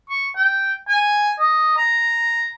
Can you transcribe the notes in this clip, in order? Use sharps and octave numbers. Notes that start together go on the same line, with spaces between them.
C#6
G5
G#5
D#5
A#5